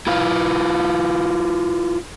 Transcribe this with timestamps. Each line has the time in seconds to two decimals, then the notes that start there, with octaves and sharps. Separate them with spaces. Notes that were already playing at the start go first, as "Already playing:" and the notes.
0.07 E4 F4 B4 F5